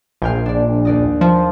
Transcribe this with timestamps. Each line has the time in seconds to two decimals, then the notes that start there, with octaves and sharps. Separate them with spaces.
0.22 A#1 F5 G5 G#5
0.46 D4 D5
0.85 D#2 D5 D#5
1.21 F3